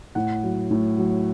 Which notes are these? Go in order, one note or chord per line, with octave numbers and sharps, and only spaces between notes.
A2 F#5
F#3
A2
F#3